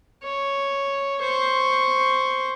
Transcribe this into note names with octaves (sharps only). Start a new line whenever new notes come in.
C#5
C5 C#6